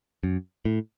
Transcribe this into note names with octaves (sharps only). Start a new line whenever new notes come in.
F#2
A2